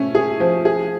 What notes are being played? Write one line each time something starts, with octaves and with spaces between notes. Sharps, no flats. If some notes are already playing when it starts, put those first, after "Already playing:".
Already playing: A3 C#4
G#4
F3
G#4